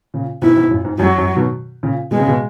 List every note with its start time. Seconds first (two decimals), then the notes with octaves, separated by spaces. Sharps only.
0.14 A#2 C#3
0.42 G#2 B2 E4
0.56 G#2 B2
0.71 F#2 A#2
0.85 G#2
0.99 F#2 F#3
1.18 F#2
1.36 B2 D#3
1.83 A#2 C#3
2.11 B2 G#3
2.20 C#3
2.28 B2